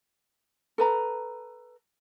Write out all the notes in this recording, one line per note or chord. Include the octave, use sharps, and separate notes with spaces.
A4 B4 A#5